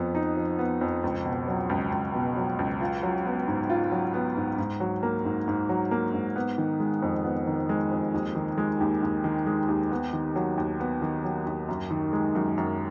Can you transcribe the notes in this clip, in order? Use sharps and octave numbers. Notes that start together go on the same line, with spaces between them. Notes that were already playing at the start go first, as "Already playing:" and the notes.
Already playing: F2 F3 B3
D#4
F3
B3
F2
C#2
B2
F#3
C#2
C#2
B2
F#3
C#2
F4
F#3
B3
G#2
F4
F#3
B3
G#2
G#2
F#3
A#3
G#2
G#2
F#3
A#3
G#2
B3
D#3
G#3
F2
B3
D#3
G#3
F2
D#2
D#3
G#3
D#2
D#2
D#3
G#3
D#2
B3
D#3
F#3
D#2
B3
D#3
F#3
D#2
F#2
D#3
G#3
F#2
F#2